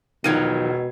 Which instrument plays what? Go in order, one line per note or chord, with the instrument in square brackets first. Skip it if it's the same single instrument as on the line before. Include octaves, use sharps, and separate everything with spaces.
[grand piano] E1 G#6 D#7 [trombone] B2 [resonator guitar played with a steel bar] D#3 F3 F#3